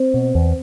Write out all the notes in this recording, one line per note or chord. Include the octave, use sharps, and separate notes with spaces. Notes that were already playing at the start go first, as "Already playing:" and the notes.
Already playing: C4
B2
E2